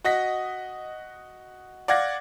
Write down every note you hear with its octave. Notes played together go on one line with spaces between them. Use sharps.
F#4 D#5 A#6 B6
D5 F5 F#5 G#6 A#6